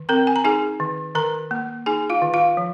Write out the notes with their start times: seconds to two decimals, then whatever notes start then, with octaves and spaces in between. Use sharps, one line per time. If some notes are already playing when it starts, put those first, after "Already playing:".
Already playing: D#3
0.09 C4 A#4 A#5
0.27 G#5
0.36 A#5
0.44 D#4 G#4 G#5
0.80 D#3
1.15 D#3 A#4 A#5
1.51 A#3
1.86 D#4 G#4 G#5
2.10 F4 F5
2.22 D#3
2.34 F4 F5
2.57 F3